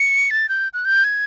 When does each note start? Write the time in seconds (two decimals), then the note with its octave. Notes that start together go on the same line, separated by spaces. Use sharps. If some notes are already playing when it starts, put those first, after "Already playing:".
Already playing: C#7
0.30 A6
0.49 G6
0.74 F#6
0.85 G6
1.04 G#6